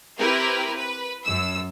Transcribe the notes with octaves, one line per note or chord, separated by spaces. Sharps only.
C4 E4 G4 A#4 B4
B4
F#2 E6